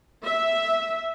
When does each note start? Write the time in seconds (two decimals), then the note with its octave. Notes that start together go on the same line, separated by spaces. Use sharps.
0.25 E5